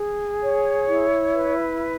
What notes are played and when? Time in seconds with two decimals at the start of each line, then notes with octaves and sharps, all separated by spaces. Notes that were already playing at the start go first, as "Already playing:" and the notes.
Already playing: G#4
0.41 C#5
0.88 E4
1.35 B4